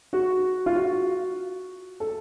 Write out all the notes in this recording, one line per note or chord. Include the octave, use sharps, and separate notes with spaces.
F#4
F4
F#4
A4